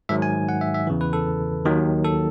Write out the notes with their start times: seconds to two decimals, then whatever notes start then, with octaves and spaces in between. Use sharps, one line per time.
0.09 G#2 D#3 F#3 E5
0.22 G#5
0.49 F#5
0.61 E5
0.74 E5
0.87 E2 C#3 E3
1.01 B4
1.13 A4
1.65 D#2 D#3 F#3
2.05 A4